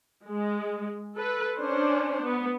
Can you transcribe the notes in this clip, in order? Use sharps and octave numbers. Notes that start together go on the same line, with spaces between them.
G#3
A4 B4
C#4 D4 C5
B3